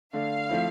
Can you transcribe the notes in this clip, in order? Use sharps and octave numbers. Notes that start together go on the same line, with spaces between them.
D3 A3 D4 F5
F3 A3 C4 E4